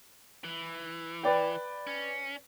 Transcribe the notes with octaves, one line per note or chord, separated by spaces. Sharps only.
E3
B4 D5 G5
C#4